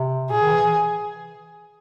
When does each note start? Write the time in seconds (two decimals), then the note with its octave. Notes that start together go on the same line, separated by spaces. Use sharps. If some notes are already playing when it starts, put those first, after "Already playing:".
Already playing: C3
0.31 A#2 G#4
0.42 D#3
0.52 E3